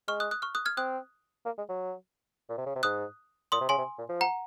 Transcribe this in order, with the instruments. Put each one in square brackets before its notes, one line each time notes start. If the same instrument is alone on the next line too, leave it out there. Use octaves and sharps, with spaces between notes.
[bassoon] G#3 [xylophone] C#6 F6
[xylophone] D#6 F#6
D#6 F#6
C#6 F6
D#6 F#6
F6 G#6
[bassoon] C4 [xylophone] D#6 F#6
[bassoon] A#3
G#3
F#3
A#2
C3
C#3
C3
[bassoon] G#2 [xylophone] D#6 F#6
[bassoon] A#2 [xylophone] C6 D#6
[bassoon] C3
[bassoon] C#3 [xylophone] G#5 C6
[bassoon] C3
A#2
F3
[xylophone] F#5 A#5